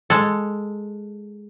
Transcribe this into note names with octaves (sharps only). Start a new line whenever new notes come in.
G#3 A4